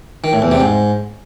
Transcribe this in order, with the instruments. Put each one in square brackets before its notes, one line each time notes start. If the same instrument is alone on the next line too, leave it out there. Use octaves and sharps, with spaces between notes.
[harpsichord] D#3
A2
E2
C3
G#2